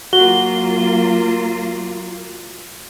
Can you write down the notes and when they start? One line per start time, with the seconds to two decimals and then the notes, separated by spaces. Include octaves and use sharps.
0.13 F#3 A#3 F4 F#4 G7